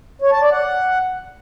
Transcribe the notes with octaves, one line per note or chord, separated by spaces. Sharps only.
C#5
A5
D5
F#5